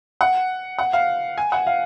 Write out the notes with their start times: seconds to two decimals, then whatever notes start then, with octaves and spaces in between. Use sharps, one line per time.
0.21 F#5
0.79 F#5
0.93 F5
1.38 G#5
1.52 F#5
1.67 F5